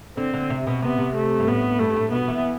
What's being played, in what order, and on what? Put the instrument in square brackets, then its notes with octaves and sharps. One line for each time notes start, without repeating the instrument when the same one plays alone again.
[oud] D3 [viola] C4
[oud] D3
C3
B2
[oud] C3 [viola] B3
[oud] C3
[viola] A3
[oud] G2
[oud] A2 [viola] B3
[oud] G2 [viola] A3
[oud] G2
A2
[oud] B2 [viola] B3
[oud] E3